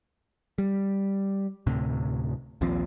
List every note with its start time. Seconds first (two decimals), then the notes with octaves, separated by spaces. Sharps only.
0.58 G3
1.66 D2 A2 C3
2.61 A#1 D#2 F3 C4